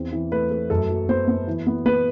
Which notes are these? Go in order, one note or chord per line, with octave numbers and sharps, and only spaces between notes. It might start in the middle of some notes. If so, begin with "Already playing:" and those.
Already playing: E2 C4
E3
A3 B4
A3
F#2 A4
F#3
B3 C5
B3
E3
B3
B3 B4